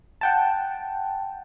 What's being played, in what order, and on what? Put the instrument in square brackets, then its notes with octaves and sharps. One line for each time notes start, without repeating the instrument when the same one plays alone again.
[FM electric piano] F#5 G5 A5